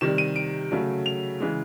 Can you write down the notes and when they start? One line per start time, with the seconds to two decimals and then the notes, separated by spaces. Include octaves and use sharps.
0.01 C3 D#3 G3 E7
0.18 D#7
0.36 D7
0.71 C#3 F#3 A3
1.06 F7
1.40 C#3 E3 G#3